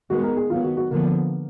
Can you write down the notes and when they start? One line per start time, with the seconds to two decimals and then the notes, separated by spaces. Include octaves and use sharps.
0.10 D#3 G#3 B3 F#4
0.23 A#4
0.37 G#4
0.50 D#3 F#3 B3 F4
0.63 F#4
0.77 F#4
0.91 D3 F3 A#3 B3